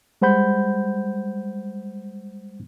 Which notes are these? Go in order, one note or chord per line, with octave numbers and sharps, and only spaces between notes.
G3 G#3 C5 F#5 B5 G6